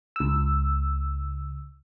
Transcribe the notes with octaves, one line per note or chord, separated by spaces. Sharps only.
C#2 E6